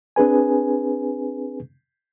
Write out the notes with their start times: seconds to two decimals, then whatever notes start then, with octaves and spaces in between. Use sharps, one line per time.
0.16 C4 D4 G#4 B4 G#5